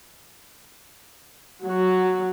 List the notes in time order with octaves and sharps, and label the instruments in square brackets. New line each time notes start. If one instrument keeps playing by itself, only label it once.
[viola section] F#3 F#4